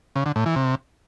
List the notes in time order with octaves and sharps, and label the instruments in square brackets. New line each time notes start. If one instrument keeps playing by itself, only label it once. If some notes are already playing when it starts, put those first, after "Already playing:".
[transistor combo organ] C#3
D3
A2
E3
C3